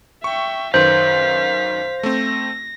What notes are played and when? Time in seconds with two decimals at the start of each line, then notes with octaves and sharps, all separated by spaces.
0.24 E5 G5 C#6
0.74 F#2 D#3 B4 C5 F5 B6
2.03 A3 C4 A#6